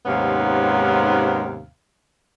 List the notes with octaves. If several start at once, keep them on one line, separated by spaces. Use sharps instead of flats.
D#2 G#2 C3 B3 C#4 F5